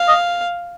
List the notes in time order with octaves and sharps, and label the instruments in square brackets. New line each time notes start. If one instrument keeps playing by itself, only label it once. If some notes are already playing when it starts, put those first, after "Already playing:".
Already playing: [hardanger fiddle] F5
[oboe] D#5